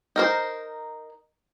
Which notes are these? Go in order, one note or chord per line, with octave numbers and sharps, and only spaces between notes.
D#4 A#4 C5